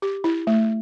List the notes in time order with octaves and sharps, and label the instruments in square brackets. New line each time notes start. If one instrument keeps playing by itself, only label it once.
[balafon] G4
E4
A3